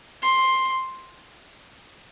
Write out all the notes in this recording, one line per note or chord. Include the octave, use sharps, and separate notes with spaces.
C6